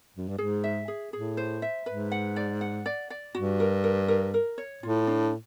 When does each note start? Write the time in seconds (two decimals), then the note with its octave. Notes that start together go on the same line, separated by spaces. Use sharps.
0.17 F#2
0.28 G2
0.38 G#2 G#4
0.64 E5
0.88 G#4
1.12 A2 G#4
1.37 C5
1.62 E5
1.86 G#2 B4
2.12 F#5
2.36 D5
2.61 F#5
2.86 D5
3.10 D5
3.35 G2 F#4
3.60 A#4
3.84 A#4
4.08 A#4
4.34 A#4
4.58 C#5
4.83 A2 F4
5.07 D4